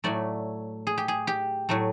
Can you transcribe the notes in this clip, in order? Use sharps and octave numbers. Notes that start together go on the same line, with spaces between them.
A2 F#3 A3 D5
G#4
G4
G#4
G4
A2 F#3 A3